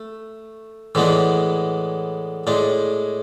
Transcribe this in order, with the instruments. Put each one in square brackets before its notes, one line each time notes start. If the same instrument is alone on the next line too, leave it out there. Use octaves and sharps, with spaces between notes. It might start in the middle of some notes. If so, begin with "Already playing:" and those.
Already playing: [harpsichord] A3
A2 E3 G#3 B3 D4
A2 G#3 D4